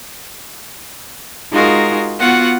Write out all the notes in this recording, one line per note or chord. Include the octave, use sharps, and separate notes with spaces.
G#3 D#4 F4 F#4 G#4 A#4
B3 F4 F#4 F#5